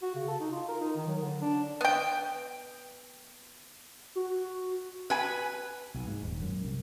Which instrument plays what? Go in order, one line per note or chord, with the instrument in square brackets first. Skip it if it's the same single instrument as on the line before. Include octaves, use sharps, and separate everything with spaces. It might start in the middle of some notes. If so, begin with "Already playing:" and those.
[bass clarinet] F#4
C#3
A4
D#4
F4
A#4
D#4
D#3
F#3
D3
D4
[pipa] B3 G5
[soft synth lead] F#4
[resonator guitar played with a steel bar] B4 G#5
[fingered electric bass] B1
G#2
D#1
F#2
C2